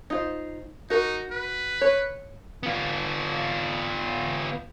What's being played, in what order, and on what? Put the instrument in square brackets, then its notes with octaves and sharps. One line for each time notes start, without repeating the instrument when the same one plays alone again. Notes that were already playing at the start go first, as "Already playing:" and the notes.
[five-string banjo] D#4 F4 C5
[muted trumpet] D#4 [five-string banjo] F#4 A#4
[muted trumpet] B4
[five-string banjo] C#5
[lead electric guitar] B3 F4